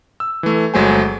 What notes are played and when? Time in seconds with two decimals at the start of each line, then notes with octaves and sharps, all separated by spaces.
0.20 E6
0.43 E3 A3
0.74 G1 F#3 G#3 A3 C5 G#5